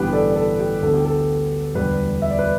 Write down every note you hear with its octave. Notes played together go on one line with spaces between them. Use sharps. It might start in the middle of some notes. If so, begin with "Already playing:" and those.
Already playing: A1 G2 D3 G3 B3 G4 B4
A4 D5
A4
G4
D2 D3 B3 A4
G4
A4
E1 D2 D3 G3 G4 B4
E5
D5
B4